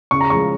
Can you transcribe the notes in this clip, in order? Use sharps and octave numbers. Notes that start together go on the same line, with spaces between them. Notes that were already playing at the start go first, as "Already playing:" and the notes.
C#3 C#6
A#5
F3 G#3 C#6